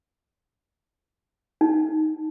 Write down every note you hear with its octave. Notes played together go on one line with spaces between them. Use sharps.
D#4